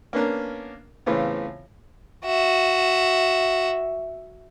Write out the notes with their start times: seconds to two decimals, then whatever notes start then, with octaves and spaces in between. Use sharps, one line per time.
0.13 A#3 B3 C#4 D4 A#4
1.06 A2 C#3 E3 B3 C4 F4
2.25 F#4 E5